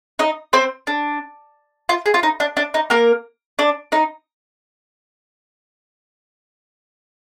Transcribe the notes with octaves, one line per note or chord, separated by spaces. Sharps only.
D#4 D#5
C4 C5
D4
F4
G#4
F4
D#4
D4
D4
D#4
A#3 A#4
D4 D5
D#4 D#5